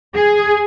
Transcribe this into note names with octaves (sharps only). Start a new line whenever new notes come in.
G#4